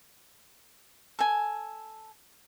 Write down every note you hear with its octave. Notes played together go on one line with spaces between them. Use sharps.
A4 G#5